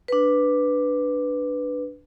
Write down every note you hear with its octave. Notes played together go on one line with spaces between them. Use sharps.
D4 B4